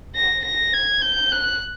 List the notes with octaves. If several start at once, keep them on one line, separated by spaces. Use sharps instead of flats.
A#6
A#6
G#6
G6
F#6